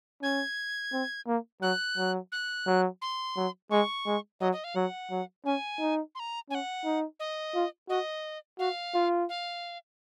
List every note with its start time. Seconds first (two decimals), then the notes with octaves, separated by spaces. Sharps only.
0.22 C#4 G#6
0.93 C4
1.27 A#3
1.62 F#3 F#6
1.98 F#3
2.32 F#6
2.67 F#3
3.02 C6
3.37 F#3
3.71 G#3 C#6
4.06 G#3
4.40 F#3 D#5
4.52 D#5
4.64 F5
4.76 F#3 F#5
5.11 F#3
5.45 C#4 G#5
5.80 D#4
6.15 C6
6.19 A#5
6.50 C#4 G#5
6.55 F#5
6.85 D#4
7.20 D#5
7.55 F4
7.89 F#4 D#5
8.59 F#4 F5
8.94 F4
9.29 F5